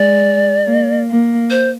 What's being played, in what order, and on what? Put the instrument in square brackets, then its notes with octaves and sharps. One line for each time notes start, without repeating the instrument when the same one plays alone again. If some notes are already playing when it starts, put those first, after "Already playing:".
Already playing: [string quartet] G#3 [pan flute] D5
[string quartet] A#3
A#3
[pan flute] C5